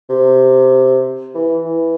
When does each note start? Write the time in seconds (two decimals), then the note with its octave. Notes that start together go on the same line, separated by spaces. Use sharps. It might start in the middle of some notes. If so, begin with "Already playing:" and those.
0.09 C3
1.35 E3
1.66 E3